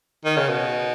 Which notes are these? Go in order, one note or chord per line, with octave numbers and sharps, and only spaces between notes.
D#3
C#3
B2